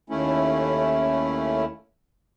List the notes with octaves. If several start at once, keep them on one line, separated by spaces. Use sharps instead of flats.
D#2 A3 C#4 E4